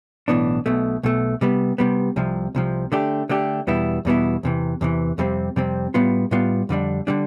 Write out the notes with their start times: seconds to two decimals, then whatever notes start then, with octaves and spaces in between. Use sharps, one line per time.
0.28 B1 A2 E3 B3 D4
0.66 B1 B2 A3
1.03 B1 B2 A3
1.41 C3 G3 B3
1.78 C3 G3 B3
2.16 C2 C3 F3
2.55 C2 C3 F3
2.92 D3 A3 D4 G4
3.29 D3 A3 D4 G4
3.67 E2 B2 G3 B3 E4
4.05 E2 B2 G3 B3 E4
4.43 E2 C3 E3
4.81 E2 C3 E3
5.18 F2 C3 G3 C4
5.56 F2 C3 G3 C4
5.94 A2 G3 B3 F4
6.31 A2 G3 B3 F4
6.69 F2 D3 G3 D4
7.07 D3 G3 D4